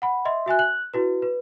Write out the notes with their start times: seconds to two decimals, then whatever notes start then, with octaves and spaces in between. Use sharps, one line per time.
0.02 F#5 B5
0.25 D#5 E5 C6
0.46 F#4 E5 G#5 F#6
0.59 F#6 F#7
0.94 E4 F#4 B4
1.22 B4